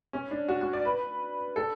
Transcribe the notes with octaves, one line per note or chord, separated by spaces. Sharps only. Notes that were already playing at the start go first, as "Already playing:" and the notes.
C#4
D4
F#4
F#4
D5
B4
A4